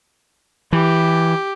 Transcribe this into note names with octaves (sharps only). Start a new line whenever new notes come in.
E3 G4